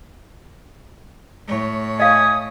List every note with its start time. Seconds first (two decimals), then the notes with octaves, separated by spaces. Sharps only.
1.48 A2 C#5
2.00 D#5 F5 G#5 D#6